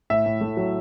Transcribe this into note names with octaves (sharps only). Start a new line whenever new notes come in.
A2 E5
A2
A3
F#3